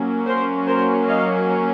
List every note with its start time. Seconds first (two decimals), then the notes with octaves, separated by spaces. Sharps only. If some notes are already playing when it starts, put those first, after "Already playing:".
Already playing: F#3 A#3 C#4
0.26 A#4 C5
0.67 A#4 C5
1.07 D#5 F5